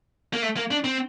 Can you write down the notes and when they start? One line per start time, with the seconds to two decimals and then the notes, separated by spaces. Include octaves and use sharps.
0.33 A#3
0.42 A3
0.57 A#3
0.71 D4
0.84 C4